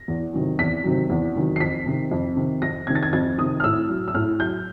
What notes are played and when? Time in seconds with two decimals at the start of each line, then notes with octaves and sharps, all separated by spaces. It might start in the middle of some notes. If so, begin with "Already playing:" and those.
Already playing: A#6
0.08 E2
0.33 C3 D#3 F#3
0.59 E2 B6
0.84 C3 D#3 F#3
1.10 E2
1.35 C3 D#3 F#3
1.56 C7
1.60 F2 B6
1.86 C3 D#3
2.11 F2
2.37 C3 D#3
2.62 F2 A#6
2.87 C3 D#3 G#6
2.95 A6
3.03 G#6
3.13 F2 G#6
3.38 C3 D#3 D#6
3.60 F6
3.64 A2 E6
3.89 F#3
4.08 E6
4.14 A2 F6
4.40 F#3 G6